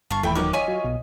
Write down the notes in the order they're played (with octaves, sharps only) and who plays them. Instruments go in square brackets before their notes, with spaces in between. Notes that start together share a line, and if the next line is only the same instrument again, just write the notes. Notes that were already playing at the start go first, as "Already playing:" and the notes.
[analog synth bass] G1 [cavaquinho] F4 F5 C#6 [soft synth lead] A5
[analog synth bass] D#1 [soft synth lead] E3 [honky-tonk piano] A3 G5 B5 [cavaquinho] E5
[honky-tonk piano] D#3 F#3 A#4 [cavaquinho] C#6 D6
[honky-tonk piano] F4 C#5 D#7 [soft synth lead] D#5 [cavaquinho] E5 G#5 C#6
[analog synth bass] F#3
B1